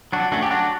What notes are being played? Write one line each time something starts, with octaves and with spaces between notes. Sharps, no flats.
F#3 D4 F#4
A3 C#4 D4 F#4
G4
F#3 D4 F#4